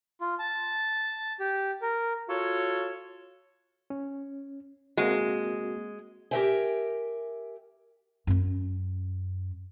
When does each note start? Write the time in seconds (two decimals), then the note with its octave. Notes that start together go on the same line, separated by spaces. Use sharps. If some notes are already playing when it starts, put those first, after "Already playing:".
0.21 F4
0.39 A5
1.40 G4
1.82 A#4
2.28 F4 F#4 A4 C#5
3.90 C#4
4.97 G#3 A#3 C4 F#4
6.31 G4 A#4 C5 E5 G5 G#5
8.27 F#2 C#4